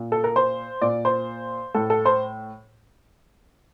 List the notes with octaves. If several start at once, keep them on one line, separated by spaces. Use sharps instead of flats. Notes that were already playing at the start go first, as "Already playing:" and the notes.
Already playing: A#2
A4
A#4
C5
A#2 D5
C5
A2 A4
A4
C5